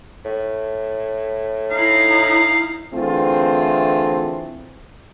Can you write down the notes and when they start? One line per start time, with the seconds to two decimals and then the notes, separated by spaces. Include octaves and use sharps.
0.25 A2
1.72 D#4 E4 F5
2.94 D3 E3 A3 C4 F4 G#4